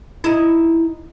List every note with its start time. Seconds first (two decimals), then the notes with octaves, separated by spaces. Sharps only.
0.24 D#4 E4